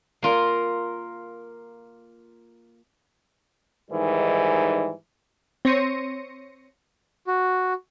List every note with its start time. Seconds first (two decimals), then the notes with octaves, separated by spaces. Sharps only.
0.22 A#3 F4 A#4
3.91 G#2 D#3 E3 G3
5.65 C4 C#5 C6 A#6 C#7 D#7
7.27 F#4